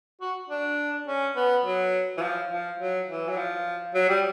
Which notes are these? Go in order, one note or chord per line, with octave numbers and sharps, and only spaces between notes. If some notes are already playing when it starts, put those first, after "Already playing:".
F#4
D4
C#4
B3
F#3
E3
F3
F3
F#3
E3
F#3
F3
F#3
G3